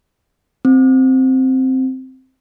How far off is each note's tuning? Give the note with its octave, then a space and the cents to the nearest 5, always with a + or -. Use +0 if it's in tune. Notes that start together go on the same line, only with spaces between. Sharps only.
C4 +0